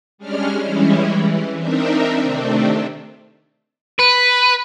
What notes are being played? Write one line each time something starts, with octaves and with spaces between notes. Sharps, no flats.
G3 G#3 C#4 D4 F6
E3 G3 G#3 C#4 E4
E3
C4 D4 D#4 A#4 E5
C3 D#3 A3 C4 D4
B4